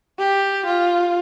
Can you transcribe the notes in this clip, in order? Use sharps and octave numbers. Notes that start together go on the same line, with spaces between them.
G4
F4